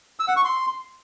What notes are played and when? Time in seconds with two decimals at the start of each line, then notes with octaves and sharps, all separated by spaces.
0.20 E6
0.28 F#5
0.36 C#6
0.45 C6